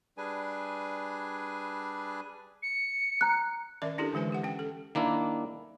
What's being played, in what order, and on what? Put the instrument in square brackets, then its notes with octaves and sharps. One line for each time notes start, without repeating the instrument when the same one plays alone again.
[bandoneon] G3 D4 G#4 B4 G#5
[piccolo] C#7
[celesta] A#5 F#6
[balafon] D#3 C#4 A#4 D5 E5 D6
D4 E4 G4 A4 A#4
D3 E3 G#3 B4 G#5
G#3 G4 F#5
C#4 G5
A4
[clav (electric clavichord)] D#3 A#3 D4 E4